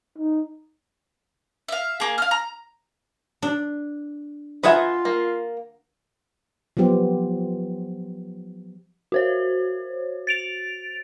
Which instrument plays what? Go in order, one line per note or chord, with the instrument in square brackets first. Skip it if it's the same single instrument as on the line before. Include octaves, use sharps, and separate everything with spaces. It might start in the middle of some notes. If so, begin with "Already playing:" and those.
[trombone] D#4
[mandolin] E5 F5
A#3 G#4
F5 F6
A#5
[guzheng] D4
[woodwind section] F4 [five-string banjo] B4 E5 A#5 [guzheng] D#5 F#5 G#5
[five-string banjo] A#3
[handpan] F3 F#3 B3 G4 C5
[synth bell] F#4 C5 C#5
A6 D7 F7